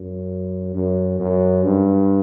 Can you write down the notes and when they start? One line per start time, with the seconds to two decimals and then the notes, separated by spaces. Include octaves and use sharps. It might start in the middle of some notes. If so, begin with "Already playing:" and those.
Already playing: F#2
0.75 F#2
1.20 F#2
1.64 G2